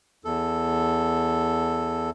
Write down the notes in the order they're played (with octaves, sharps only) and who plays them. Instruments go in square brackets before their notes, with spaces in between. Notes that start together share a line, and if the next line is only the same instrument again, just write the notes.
[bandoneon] E2 A4